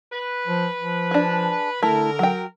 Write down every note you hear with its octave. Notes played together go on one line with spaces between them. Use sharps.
B4
F3
F3
D4 G#4
D3 A3 E4 A#4
F#3 G5